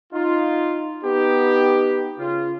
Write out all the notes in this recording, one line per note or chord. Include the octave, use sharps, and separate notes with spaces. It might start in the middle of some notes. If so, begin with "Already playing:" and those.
D#4 F4
B3 D#4 G4
C#3 F4